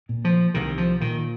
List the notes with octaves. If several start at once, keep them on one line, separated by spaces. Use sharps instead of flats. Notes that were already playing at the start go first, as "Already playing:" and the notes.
A#2
F3
C2 D#3
F3
A#2 D#3